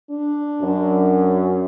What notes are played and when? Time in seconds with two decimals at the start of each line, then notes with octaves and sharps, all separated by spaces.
0.11 D4
0.61 F#2